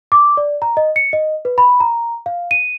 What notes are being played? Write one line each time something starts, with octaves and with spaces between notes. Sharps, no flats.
D6
D5
A#5
D#5
C#7
D#5
B4
B5
A#5
F5
D#7